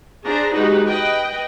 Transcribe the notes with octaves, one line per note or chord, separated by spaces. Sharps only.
D4 G#4 C5 A#5
G#3 D#4 F#4 G4 B4
B4 D#5 G5